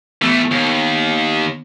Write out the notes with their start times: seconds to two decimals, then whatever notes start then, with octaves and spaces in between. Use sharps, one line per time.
0.22 E3 A3 B3
0.52 D#2